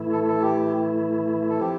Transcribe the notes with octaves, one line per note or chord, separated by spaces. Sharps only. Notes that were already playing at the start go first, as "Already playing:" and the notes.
Already playing: A2 E3 A3 E4
A4
A4
G4
A4
F3 C4 E4 G4